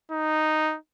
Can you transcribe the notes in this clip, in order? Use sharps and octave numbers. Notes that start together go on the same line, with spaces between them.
D#4